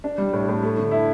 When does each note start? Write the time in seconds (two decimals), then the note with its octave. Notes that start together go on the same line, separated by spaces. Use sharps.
0.04 D4
0.18 G3
0.33 A2
0.48 A2
0.63 A3
0.77 D3
0.91 E4